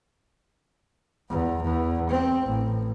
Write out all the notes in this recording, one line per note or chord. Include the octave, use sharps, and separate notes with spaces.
E2
E2
C4
A1